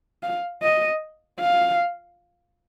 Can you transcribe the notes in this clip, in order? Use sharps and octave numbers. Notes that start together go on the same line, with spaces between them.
F5
D#5
F5